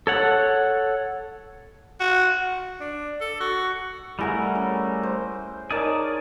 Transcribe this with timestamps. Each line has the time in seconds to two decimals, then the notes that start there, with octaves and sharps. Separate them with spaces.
0.07 A4 C#5 F#5
2.00 F#4
2.80 D4
3.21 A4
3.40 F#4
4.19 G3 A3 E4 G#4 A#4 F#5
4.55 C#4
5.03 C5
5.71 D#4 G#4 A#4 C#5 D5 A5